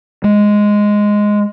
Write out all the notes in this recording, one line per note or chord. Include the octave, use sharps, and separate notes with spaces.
G#3